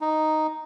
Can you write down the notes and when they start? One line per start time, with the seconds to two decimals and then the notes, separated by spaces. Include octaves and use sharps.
0.01 D#4